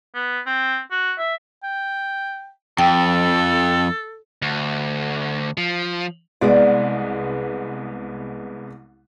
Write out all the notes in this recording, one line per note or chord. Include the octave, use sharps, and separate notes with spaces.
B3
C4
F#4
E5
G5
F2 A4 G5
D2
F3
C2 G#3 B3 D5 F#5